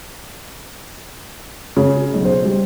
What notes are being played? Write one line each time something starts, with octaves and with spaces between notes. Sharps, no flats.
C#3
B1
C5
G3